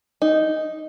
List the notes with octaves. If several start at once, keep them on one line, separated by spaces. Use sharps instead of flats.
D#4